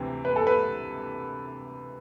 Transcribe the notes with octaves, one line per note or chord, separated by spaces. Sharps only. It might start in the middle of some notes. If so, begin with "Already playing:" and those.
Already playing: D2 C3 E3 C4
B4
A4
B4